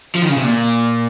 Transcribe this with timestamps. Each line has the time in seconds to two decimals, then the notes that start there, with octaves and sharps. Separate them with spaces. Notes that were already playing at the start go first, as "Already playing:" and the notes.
0.15 F3
0.22 D#3
0.29 C#3
0.37 C3
0.44 A#2